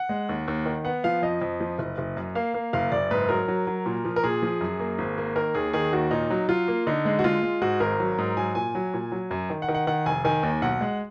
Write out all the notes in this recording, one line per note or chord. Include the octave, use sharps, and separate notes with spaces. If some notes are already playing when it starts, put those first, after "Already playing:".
Already playing: F#5
G#3
D#2
D#2
D#3
B3 F#5
F3 F5
F2 D#5
F2
F3
F#1
F#1
F#2
A#3 F5
A#3
F#1 F5
F#1 D5
G#2 B4
F#3 A#4
F#3
F#3
A#2
F3
A#4
A#2 G#4
F3
F#2
A#3
G#1
A#3
D#3 A#4
D#2 G#4
D#3 G#4
D#2 F#4
A#2 D#4
F#3
F#3 F4
A#3
D3 D#4
G#3
F#4
G#3 F4
G#3
G#2 F#4
G#1 A#4
F#3
G#2
F#3 G#5
A#2 G#5
F#3
A#2
F#3
F#2
D#3
F#5
D#3
F#5
D#3 F#5
F1 G#5
D#3 G#5
D#2
B1 F#5
G#3